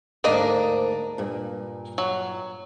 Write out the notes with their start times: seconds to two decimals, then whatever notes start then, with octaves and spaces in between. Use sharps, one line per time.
0.24 D2 G#2 A#3 D4 A#4 D#5
1.18 G2 A#2
1.98 F#3